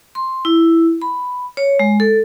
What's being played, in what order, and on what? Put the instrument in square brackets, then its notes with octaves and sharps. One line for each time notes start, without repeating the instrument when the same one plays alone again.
[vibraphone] C6
E4
B5
C#5
G#3
A4